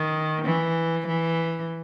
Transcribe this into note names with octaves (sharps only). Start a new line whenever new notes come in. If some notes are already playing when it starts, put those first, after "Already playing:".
Already playing: D#3
E3
E3